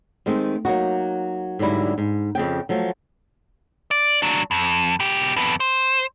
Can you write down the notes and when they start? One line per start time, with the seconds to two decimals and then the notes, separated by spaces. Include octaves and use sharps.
0.26 D#3 G#3 A3 C4
0.65 F#3 A#3 D#4 F#4
1.59 G#2 D3 F#3 G3 E4
1.98 G#2
2.35 F2 C#3 G5
2.69 F3 F#3 A3
3.91 D5
4.22 F#3 D4
4.51 F2
5.00 B2 G4
5.36 F2 B3
5.60 C5